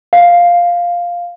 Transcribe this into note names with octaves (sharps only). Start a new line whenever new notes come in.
F5